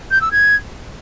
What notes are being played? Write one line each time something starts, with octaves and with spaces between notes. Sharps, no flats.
G6
E6
G#6